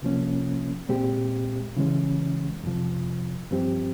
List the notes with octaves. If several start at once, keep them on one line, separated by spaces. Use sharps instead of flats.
C2 C3 F3 A#3 C#4
A#2 G#3 C4 G4
C#3 E3 G#3 C#4
F2 C3 F3
G2 F3 C4 G4